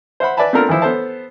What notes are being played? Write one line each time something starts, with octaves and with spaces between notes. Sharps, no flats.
C5 E5 F#5 B5
B4 D5 E5 G#5 A5 B5
B3 C4 D4 F4 A4 A#4
E3 F3 E4 C5
B3 A4 C5 A5